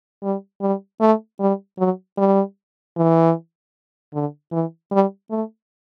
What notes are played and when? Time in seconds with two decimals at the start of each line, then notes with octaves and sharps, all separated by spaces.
0.23 G3
0.61 G3
1.00 A3
1.40 G3
1.78 F#3
2.18 G3
2.97 E3
4.13 D3
4.52 E3
4.92 G3
5.31 A3